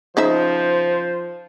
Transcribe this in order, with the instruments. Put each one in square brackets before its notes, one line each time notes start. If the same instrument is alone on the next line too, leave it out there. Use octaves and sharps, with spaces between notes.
[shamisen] C#3 D#4 E5 [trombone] F3 [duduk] C5